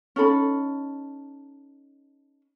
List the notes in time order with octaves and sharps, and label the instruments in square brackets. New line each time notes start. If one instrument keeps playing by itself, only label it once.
[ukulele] C#4 D#4 A4 B5